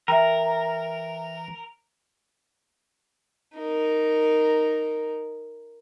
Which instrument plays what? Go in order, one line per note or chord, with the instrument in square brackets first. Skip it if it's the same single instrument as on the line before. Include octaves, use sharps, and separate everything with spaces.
[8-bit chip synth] E3 [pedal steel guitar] A#4 [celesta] E5 G5
[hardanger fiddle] D#4 A#4